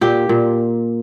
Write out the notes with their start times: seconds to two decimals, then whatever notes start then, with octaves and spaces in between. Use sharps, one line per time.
0.01 A#2 G4
0.29 A#2